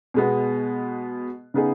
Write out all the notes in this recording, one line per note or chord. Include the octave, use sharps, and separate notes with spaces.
B2 G#3 B3
C#3 B3 D#4 G#4